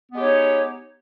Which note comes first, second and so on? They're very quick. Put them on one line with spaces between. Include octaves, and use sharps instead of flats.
B3 G#3 G4 C#5 D#4